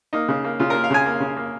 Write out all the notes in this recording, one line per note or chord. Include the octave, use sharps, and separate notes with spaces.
A#3 D#4
C#3
A#3
C#3 F4
A#3 A#4
F5
C#3 G#5
A#3
C#3
A#3